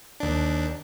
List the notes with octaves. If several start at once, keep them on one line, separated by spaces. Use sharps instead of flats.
D#2 D4